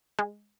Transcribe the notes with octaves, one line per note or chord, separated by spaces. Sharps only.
G#3